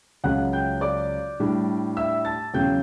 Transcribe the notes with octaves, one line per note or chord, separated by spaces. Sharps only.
C#2 C#3 F#3 C#4 F#5 F#6
G5 G6
D5 D6
A2 G3 D4
E5 E6
A5 A6
E2 C#3 F#3 C#4 G5 G6